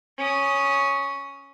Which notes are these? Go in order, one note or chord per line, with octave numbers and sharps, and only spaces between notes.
C#4 D#6